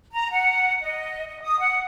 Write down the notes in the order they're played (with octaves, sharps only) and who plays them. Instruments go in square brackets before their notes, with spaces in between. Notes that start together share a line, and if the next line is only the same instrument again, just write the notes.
[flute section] A#5
F#5
D#5
D#5
D#6
F#5